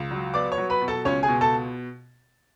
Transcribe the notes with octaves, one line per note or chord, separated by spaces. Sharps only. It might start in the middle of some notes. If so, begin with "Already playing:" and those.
Already playing: C#2
F#3
B3 D5 D6
C#5 C#6
F#3
B4 B5
B2
A4 A5
C#2 C#4 C#5
G#4 G#5
B2
A4 A5